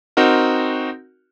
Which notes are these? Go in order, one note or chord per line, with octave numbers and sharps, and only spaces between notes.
C4 D#4 F#4 A#4